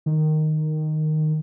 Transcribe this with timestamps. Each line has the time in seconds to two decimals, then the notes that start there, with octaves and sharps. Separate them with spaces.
0.06 D#3